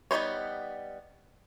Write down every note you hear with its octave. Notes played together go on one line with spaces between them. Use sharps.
G3 B3 D#4 C5 C#5